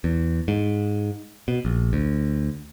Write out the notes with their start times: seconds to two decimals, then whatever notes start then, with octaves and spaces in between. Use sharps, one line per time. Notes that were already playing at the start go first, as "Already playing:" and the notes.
0.04 E2
0.48 G#2
1.48 B2
1.65 A#1
1.93 D2